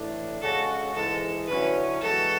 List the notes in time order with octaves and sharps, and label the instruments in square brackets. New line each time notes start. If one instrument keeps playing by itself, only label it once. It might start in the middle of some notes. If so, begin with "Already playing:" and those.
Already playing: [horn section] A2 E3 A3 D4
[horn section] C#3 G#3 C#4 F#4 [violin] A4
[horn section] G#2 E3 G#3 [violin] A4
[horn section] D3 F#3 C#4 E4 [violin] B4
[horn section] E3 G#3 B3 F#4 [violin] A4